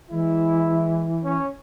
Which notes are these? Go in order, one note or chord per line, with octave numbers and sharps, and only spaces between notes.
E3 G#3 E4
C#4